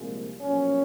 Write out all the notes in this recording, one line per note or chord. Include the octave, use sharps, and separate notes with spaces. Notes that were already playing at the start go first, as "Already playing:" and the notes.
Already playing: C2 A#2 F3 G#3
B1 A#2 F3 C#4